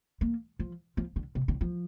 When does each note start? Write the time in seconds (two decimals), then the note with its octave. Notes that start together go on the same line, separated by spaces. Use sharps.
0.21 A#3
0.59 F3
0.97 F3
1.16 D3
1.35 C3
1.48 D3
1.61 F3